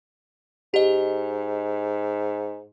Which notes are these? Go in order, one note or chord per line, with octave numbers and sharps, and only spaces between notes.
G#2 G4 D#5